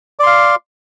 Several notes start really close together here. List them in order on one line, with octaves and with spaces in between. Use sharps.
D5 C6 F5